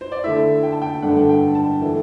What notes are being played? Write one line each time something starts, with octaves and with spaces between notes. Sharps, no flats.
C5
D5
D3 A3 E4 E5
G5
A5
G5
G2 D3 A3 D4 F#5
F#5
G5
A5
E3 A3